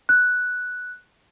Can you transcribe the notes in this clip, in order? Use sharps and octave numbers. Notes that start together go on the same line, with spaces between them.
F#6